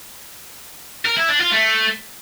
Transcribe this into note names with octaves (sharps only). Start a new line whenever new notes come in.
A#4
E4
D4
F4
A3